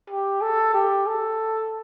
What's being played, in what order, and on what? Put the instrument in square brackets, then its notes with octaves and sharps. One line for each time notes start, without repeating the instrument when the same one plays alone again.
[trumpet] G4
A4
G4
A4